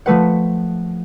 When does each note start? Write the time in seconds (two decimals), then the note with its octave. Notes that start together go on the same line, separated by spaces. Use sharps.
0.06 F3 A3 B4 F#5